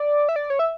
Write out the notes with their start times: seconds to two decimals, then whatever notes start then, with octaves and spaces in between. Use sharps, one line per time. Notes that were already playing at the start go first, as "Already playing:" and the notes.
Already playing: D5
0.29 E5
0.36 D5
0.50 C#5
0.59 E5